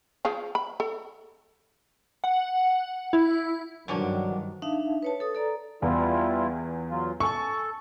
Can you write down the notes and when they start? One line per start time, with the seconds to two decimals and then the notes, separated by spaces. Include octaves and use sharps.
0.25 F3 G#4 F5
0.55 B5
0.80 A4
2.24 F#5
3.13 E4
3.88 G2 D3 D#3 F3 F#3 C#4 D4
4.62 D4 D#4 E5 F5 A5
5.03 B4 C#5 A5
5.20 A4 D#6
5.35 A4 D5 A#5
5.82 E2 G3 E4 F4
6.90 F#3 F4
7.20 A4 G#5 C#6